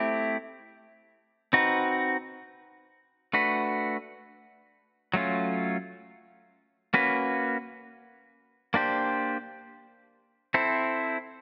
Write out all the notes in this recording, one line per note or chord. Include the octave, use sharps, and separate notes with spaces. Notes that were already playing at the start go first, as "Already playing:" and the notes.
Already playing: A3 C4 E4 G4
C4 D#4 F#4 B4
A3 D4 F#4 B4
F#3 A3 C#4 F4
A#3 C#4 F#4 B4
A#3 D4 G4 C5
C4 E4 A4 C5